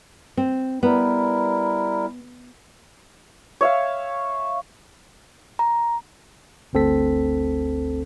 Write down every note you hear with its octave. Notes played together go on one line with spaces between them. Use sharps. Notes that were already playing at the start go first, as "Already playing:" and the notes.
C4
G3 B3 E4 A#4
C#5 E5 F5
A#5
G1 D2 C4 A4 B6